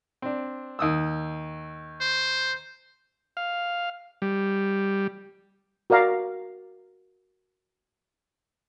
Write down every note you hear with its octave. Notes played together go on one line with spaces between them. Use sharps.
C4 D4
D#2 D#6 E6
C5
F5
G3
F#4 A#4 D5 F5 A#5